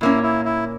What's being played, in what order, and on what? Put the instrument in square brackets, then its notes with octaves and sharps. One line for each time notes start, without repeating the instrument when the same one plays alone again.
[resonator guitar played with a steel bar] A#2 A#3 C#4 [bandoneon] E4
[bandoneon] E4
E4